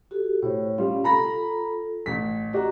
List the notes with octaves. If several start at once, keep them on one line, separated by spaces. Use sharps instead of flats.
F#4 G4 A4
A2 C5 C#5
G3 C#4 F4 G4 F5
F4 A4 A#5 B5 A#6
A1 B6
F#4 G4 D5 D#5 A#5